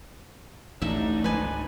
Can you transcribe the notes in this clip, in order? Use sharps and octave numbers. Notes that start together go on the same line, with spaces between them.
A1 D2 A3 D4 D#4 E5
G#1 C#2 F3 B4 G#5